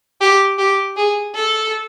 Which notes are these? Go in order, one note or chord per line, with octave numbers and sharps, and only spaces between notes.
G4
G4
G#4
A4